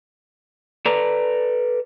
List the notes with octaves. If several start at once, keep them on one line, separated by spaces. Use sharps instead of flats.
A4 B4 D5 A#5